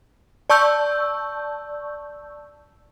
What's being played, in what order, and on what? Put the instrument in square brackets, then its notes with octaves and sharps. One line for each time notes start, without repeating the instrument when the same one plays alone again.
[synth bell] D5 A5 C#6 E6 G6